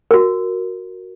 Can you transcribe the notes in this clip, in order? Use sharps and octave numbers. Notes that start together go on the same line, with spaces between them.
F#4 A#4